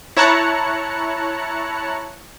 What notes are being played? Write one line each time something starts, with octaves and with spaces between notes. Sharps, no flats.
E4 C#5 A5 A#5 F#6 C#7